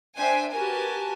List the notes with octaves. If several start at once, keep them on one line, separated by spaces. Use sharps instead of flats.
D4 C5 E5 G5 G#5
F#4 G4 A#4 B4 G#5 A5